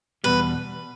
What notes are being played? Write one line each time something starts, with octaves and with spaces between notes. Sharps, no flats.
E2 B2 G3 B4